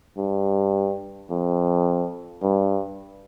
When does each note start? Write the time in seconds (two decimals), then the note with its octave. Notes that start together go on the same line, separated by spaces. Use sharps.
0.17 G2
1.30 F2
2.42 G2